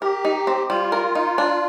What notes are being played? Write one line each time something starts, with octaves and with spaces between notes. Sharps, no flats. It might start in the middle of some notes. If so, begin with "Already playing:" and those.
G4 A#4
D#4
C4
G3 F4
A#4
D#4
D4